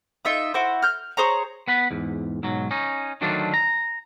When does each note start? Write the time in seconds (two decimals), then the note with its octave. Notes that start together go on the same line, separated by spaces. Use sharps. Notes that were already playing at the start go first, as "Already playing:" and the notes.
0.25 D#4 F4 E5 D#6
0.54 E4 F#4 C5
0.82 F6 G6
1.17 G#4 C5 C#5 A#5
1.68 B3 F#5 B5
1.91 E2 G#2
2.43 B1 G#2 F#3
2.71 C#4 D#4
3.21 D3 D#3 F#3 A3 D4 F4
3.54 A#5